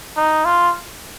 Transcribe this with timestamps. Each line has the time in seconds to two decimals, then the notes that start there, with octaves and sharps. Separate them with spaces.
0.16 D#4
0.45 F4